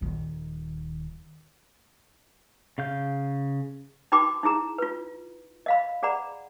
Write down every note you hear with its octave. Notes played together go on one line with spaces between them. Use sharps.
D#1 D#3
C#3 F5 G6
D#4 F#4 G5 B5 D6
D#4 E4 G#4 A#5
F4 B4
D#5 F5 B5
G#4 D5 F#5 A#5 B5